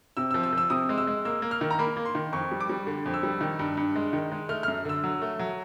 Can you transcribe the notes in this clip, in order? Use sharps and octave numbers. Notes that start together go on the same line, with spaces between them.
C3 E6
E6
F3
E6
F3
E6
C3 D#6
G#3
E6
G#3
A#3 E6
A#3
F6
D#3
A#5
A#3 B5
A#3
C6
D#3
F2 C#6
G3
D6
G3
D3
F2
E6
G3
D#3
G2
G2
G#3
D#3
G#3
A3 F6
F#2 F6
D3 E6
F#3
A3
F#3